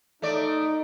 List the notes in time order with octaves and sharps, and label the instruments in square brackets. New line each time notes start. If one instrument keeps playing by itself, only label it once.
[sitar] A3 D5 [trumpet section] D#4